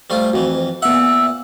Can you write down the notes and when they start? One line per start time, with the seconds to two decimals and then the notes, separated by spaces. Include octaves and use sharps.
0.10 G3 A3 F4 C5
0.33 F2 E3 F#4
0.82 A#2 B3 E5 F#5 E6